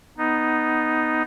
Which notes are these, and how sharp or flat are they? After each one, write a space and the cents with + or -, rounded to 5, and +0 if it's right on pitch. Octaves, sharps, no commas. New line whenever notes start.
B3 +0 D#4 +0